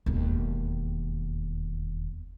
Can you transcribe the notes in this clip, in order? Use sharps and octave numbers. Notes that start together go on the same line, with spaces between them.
E1 D#2